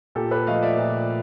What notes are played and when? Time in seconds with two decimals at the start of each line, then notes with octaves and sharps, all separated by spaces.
0.15 A#2 G4 A4
0.31 A4 B4
0.47 F3 A3 D#5 F5
0.62 D5 E5
0.77 A#2